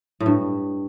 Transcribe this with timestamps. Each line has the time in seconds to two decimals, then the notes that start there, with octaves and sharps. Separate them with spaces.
0.20 A2
0.26 G2